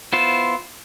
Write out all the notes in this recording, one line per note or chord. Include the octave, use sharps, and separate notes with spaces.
B3 E4 F4 C5